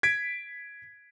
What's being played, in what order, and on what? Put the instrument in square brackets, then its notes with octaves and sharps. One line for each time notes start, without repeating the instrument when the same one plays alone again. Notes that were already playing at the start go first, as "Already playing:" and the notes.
[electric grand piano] G#6 B6 D7